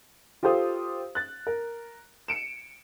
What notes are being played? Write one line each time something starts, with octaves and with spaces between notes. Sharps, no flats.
F4 G4 A4 C5 F5 D#6
F#6 A6
A#4
C#7 D7 E7